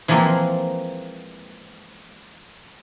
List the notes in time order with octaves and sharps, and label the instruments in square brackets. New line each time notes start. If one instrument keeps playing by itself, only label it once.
[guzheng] E3 F3 G#3 A#3 C4